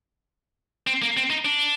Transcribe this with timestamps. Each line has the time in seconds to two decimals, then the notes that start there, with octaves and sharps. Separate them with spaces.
0.87 C4
1.02 A#3
1.17 C4
1.30 D#4
1.45 D4